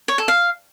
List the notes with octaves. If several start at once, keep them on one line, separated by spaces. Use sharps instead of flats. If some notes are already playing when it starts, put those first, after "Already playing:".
C#5
A4
F5